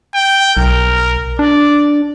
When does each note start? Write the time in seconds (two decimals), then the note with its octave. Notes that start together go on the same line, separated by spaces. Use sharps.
0.14 G5
0.57 B1 A#4
1.39 D4 D5